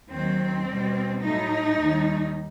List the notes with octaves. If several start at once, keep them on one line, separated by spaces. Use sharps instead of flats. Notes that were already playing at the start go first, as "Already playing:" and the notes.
D#2 D#3 F#3 C4
B2 G3
A2 F#3 A3 D#4
D#2 D#3 G3